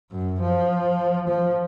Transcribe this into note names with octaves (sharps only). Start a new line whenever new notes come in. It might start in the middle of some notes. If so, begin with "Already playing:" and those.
F#2
F3
F3